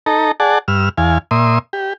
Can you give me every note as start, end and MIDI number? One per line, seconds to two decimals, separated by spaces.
0.06 0.32 63
0.06 0.32 69
0.06 0.32 82
0.40 0.59 68
0.40 0.59 74
0.40 0.59 78
0.40 0.59 81
0.68 0.89 43
0.68 0.89 88
0.68 0.89 89
0.98 1.18 40
0.98 1.18 77
0.98 1.18 80
1.31 1.59 46
1.31 1.59 76
1.31 1.59 84
1.31 1.59 87
1.73 1.93 67